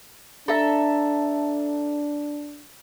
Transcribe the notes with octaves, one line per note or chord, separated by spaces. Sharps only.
D4 A4 E5 A#5